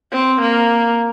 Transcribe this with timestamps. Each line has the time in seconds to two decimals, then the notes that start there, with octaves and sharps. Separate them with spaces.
0.12 C4
0.41 A#3